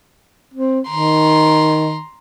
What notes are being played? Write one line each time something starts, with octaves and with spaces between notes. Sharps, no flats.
C4
D#3 A#5 C6